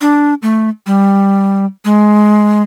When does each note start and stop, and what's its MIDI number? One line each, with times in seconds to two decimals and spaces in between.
0.01 0.34 62
0.42 0.69 57
0.86 1.65 55
1.85 2.62 56